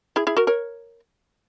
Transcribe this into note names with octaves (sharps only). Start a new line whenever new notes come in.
E4 G#4
E4 G#4
F#4 A#4
A#4 C#5